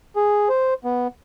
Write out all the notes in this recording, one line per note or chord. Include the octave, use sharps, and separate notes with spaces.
G#4
C5
B3